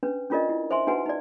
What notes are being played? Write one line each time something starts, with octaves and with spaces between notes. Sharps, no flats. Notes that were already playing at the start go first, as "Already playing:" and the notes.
C#4 D4 B4
C#4 D4 F4 A#4 D5 D#5
E4
C5 E5 G#5 C6
D4 D#4 F#4 B4 F#5 G#5
D#4 D5